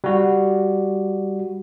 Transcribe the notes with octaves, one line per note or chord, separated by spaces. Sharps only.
G3 F#4